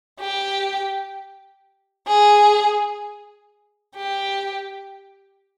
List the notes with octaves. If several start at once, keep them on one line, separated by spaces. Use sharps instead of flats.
G4
G#4
G4